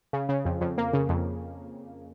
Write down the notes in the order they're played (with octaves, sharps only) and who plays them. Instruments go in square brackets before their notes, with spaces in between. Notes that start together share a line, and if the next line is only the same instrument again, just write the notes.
[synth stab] C#3
C#3
F2
F2
A#3
C#3
F2